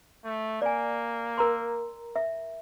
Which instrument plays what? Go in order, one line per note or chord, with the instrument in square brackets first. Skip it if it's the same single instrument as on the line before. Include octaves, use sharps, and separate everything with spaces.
[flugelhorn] A3
[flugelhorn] A#3 [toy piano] D5 G#5
[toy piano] A#4 A#5 C6
E5